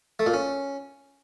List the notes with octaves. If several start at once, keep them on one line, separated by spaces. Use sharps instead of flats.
A3
A#2
C#4